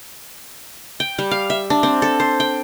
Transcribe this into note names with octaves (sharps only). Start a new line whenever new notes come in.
G5
G3
F5
E5
D4
C4
A4
C5
G5